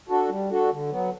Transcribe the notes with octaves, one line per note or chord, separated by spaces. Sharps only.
D4 F#4 A4
G3
D4 F#4 A4
D3
F#3 B3